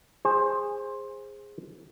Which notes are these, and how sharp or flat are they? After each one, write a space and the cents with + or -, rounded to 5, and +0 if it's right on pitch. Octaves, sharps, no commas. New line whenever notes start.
G#4 -15 C5 +15 G#5 -20